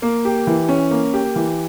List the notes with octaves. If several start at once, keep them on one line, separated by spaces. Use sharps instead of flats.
A#3
G4
E3
C#4
A#3
G4
E3